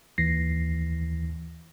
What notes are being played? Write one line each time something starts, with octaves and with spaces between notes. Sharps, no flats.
D#2 E3 A#6 C7